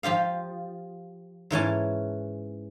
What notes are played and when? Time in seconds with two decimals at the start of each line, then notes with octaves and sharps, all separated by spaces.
0.03 F3 F4 G4 F5
1.51 G#2 E3 C#4 A5